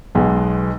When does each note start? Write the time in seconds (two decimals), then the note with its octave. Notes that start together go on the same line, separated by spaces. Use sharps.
0.15 B1 B2 G#3 B3